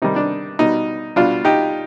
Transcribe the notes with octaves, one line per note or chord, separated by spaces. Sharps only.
C3 D#3 G3 D#4
D4
B2 G3 D#4
B2 G3 D4 F4
D#4 G4